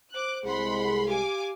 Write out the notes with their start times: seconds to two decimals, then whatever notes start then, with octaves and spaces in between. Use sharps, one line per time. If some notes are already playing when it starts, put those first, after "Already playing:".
0.14 C5 D6 F#6
0.45 C2 G#3 G#4 F#5 B5 C6
1.07 G4 F5 G#5 D6